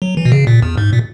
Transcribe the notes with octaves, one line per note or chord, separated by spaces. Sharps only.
F#3
E3
B2
C#3
A#2
E2
G#2
A#2